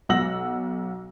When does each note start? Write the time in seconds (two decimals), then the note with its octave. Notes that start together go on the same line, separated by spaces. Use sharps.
0.09 B1 F#5 E6 A#6 F#7